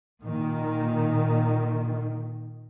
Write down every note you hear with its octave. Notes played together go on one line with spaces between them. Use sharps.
A#2 D#3